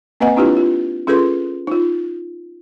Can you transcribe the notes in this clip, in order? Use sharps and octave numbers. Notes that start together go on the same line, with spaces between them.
A#3 C4 B4 D#5 F#5 G#5
C4 D4 E4 F4 G4 B4
F4
C#4 F4 G#4 A4 B4 C6
D#4 F4